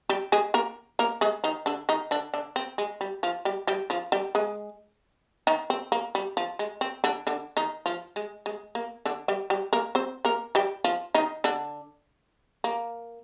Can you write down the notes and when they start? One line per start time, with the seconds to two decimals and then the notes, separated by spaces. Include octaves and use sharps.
0.09 G3 G4
0.32 G#3 G#4
0.54 A#3 A#4
0.99 A#3 A#4
1.21 G#3 G#4
1.44 D#3 D#4
1.66 D3 D4
1.89 D#3 D#4
2.11 D3 D4
2.34 D3 D4
2.56 C4
2.78 G#3
3.01 G3
3.23 F3 F4
3.45 G3 G4
3.67 G3 G4
3.90 F3 F4
4.12 G3 G4
4.35 G#3 G#4
5.47 D#3 D#4
5.70 C4
5.92 A#3
6.15 G3
6.37 F3
6.59 G#3
6.81 C4
7.04 D3 D4
7.27 D3 D4
7.57 D#3 D#4
7.86 F3 F4
8.16 G#3
8.46 G#3
8.75 A#3
9.05 D3 D4
9.28 G3 G4
9.50 G3 G4
9.73 A#3 A#4
9.95 C4 C5
10.25 A#3 A#4
10.55 G3 G4
10.84 F3 F4
11.14 D#3 D#4
11.44 D3 D4
12.64 A#3